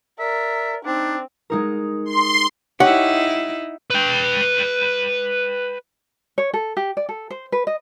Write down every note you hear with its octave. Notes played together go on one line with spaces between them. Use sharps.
A#4 D5 E5
C4 D4 D#4
G#3 D#4 A#4
C6
D#4 E4 G4 C#5 F#5
B4 G5
C#5
A4
G4
D5
A4
C5
B4
D#5